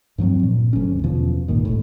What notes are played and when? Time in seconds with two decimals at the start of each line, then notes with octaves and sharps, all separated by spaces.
0.18 G2 F3 F#3 C4
0.43 A#2
0.73 G1 D2 F#3 C#4
1.04 E2 B2 F3
1.48 C#2 G2 A#2 D#3
1.65 G1 A2